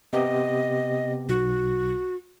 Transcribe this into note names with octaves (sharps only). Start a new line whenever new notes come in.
C3 B3 G4 D#5
B1 F#4